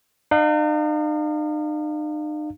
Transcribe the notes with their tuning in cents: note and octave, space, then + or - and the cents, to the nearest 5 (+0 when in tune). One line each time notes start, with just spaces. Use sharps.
D#4 -45 F5 +0